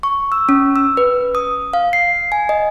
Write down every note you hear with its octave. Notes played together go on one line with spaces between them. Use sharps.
C#6
E6
C#4
E6
B4
D#6
F5
C7
G#5
D#5